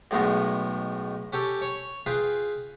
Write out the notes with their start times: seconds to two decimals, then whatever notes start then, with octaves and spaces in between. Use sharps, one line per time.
0.11 B1 A2 G#3 B3
1.32 C#4 G4 A4
1.61 C#5
2.06 F4 G#4 B4 G5